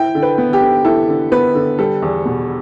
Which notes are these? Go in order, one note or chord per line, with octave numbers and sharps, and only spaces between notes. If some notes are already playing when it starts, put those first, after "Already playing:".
Already playing: E4 G5
D3
B4
B3
G4
D3
E4 A4
D3
B3 B4
D3
G3 A4
E2
B2